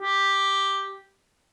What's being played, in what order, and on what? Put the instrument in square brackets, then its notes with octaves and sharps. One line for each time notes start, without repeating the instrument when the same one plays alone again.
[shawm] G4